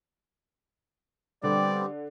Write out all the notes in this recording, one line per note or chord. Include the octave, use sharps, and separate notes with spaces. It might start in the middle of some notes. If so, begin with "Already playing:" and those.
D3 G3 B3 C4 G4 D5